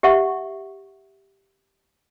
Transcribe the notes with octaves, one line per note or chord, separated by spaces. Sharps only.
G4 E5 F#5 C#6